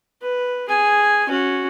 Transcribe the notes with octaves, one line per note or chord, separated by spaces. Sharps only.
B4
G#4 G#5
C#4 F#4